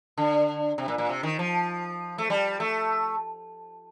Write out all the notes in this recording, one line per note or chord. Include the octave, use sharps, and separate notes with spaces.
D3
C3
A#2
A#2
C3
D#3
F3
A3
G3
A3